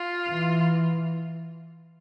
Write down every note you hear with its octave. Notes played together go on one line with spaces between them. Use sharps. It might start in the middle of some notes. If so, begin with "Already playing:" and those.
Already playing: F4
E3